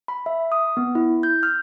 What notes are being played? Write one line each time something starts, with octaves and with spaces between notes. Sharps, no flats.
B5
E5
D#6
B3
E4
G6
F6